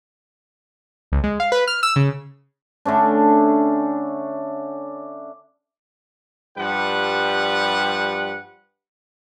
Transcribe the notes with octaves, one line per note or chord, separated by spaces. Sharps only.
C#2
G#3
F5
B4
F6
E6
C#3
D3 A3 C#4 D4
G2 F3 G3 B4 F#5